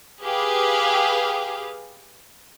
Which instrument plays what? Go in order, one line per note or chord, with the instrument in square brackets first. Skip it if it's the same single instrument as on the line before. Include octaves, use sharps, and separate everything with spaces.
[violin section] G4 G#4 B4 F5